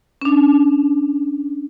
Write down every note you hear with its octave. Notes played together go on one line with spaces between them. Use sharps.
C#4 D4